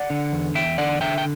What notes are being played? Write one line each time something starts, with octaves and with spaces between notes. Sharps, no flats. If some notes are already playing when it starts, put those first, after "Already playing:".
Already playing: D5 F#5
D3
E2
E2 E5 G5
D3 D5 F#5
D3 E5 G5
G5